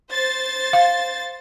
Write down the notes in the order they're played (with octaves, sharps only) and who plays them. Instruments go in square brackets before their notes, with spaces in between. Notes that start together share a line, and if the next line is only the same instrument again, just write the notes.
[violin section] C5 A6
[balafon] F5